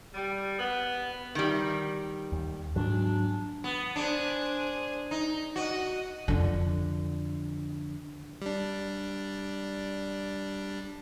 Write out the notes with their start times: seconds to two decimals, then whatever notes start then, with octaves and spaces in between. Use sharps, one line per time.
0.14 G3
0.59 B3
1.35 D#3 G3
2.32 D#2
2.76 G#2 F#3 D4
3.64 B3
3.96 D4 G#4 C5
5.11 D#4
5.56 F#4 D#5 F#5
6.28 F2 D3
8.42 G3 D4